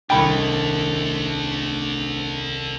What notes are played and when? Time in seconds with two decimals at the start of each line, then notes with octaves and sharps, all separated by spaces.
0.10 D#1 C2 D3 A3 D4 G5 B5 G#6